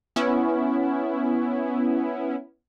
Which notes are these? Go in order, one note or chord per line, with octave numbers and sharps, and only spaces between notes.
B3 C#4 E4